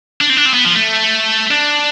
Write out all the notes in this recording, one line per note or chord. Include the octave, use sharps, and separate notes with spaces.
D4
C4
D4
C4
B3
F3
A3
D4